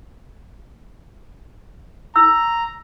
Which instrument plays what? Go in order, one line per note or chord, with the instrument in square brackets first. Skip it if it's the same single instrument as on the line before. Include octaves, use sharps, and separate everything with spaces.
[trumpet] A#5 [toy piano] E6